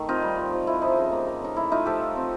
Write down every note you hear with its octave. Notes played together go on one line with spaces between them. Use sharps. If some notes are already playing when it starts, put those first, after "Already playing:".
Already playing: D#3 A3
C4 D#4 F4
G3
F3
F3
F3 E4
F3 D#4
C#3
A#3
A#3
C#3 D#4
A3 E4
A3 D#4 F4
F3 G4 A4
F3
C4